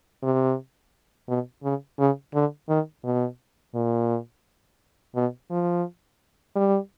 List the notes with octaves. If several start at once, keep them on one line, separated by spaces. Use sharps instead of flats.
C3
B2
C#3
C#3
D3
D#3
B2
A#2
B2
F3
G3